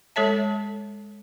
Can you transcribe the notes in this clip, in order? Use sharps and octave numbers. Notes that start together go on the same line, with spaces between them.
G#3 A4 C#5 E5 A5